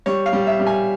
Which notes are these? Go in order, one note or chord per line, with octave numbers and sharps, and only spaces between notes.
G3 C#5
F5
G3
E5
G3
G#5